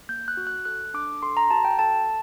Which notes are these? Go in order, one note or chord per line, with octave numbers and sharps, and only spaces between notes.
A#3 G6
F#6
F#4
F#6
A4 F#6
D4 D6
A4 C6
A#5
F#4 A5
G5
A4 A5